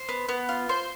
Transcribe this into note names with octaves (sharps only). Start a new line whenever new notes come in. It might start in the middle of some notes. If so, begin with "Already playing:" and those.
Already playing: C5
B3
B3
F4
C5